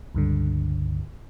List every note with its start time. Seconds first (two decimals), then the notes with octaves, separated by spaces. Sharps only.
0.15 C#2 G2 D3